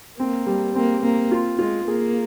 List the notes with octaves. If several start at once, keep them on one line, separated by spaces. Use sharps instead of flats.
A#3 C4
G3
A#3 C4
A#3 C4
F4
G#3 F4
A#3 G#4